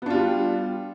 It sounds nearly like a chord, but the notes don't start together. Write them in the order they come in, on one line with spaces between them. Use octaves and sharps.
B3 D4 F4 G3